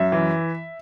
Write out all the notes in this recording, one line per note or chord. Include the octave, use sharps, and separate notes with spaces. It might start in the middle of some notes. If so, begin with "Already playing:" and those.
Already playing: F#2 E5
E3